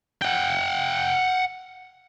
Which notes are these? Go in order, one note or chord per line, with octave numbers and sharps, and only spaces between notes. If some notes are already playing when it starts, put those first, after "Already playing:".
F#5 G5